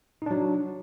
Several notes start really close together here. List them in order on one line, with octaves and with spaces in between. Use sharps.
D#4 D4 F#3